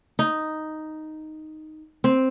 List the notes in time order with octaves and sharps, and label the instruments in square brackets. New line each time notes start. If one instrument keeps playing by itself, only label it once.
[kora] D#4
C4